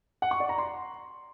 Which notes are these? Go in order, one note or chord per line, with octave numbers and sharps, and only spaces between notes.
F#5
C#6
D5
A#5
C6